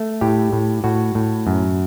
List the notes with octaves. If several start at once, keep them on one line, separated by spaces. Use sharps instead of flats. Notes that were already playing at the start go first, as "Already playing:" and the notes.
Already playing: A3
A2 G4
A2
A2 F#4
A2
F#2